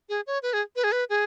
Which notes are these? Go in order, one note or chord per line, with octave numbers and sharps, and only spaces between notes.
G#4
C#5
B4
G#4
B4
G#4
B4
G#4